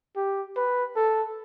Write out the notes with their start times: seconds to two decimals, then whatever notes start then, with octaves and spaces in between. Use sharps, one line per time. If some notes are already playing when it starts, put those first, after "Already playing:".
0.16 G4
0.57 B4
0.96 A4